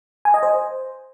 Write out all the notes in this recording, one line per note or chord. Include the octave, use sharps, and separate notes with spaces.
G#5
D#5
C5